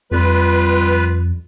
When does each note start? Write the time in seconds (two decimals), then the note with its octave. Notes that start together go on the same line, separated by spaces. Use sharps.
0.12 F2 G3 F4 B4